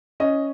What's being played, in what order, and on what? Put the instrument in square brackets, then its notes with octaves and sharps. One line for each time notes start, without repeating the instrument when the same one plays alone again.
[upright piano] C#4 D#5